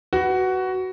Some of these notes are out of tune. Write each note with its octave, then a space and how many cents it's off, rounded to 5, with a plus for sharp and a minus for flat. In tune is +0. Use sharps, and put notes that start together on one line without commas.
F#4 +15 B4 +0